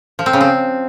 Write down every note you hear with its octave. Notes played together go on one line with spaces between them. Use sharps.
F3
C4
C#3
C4